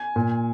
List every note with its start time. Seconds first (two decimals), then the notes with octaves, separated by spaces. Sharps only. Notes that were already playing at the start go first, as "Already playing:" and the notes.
Already playing: G#5
0.16 A#2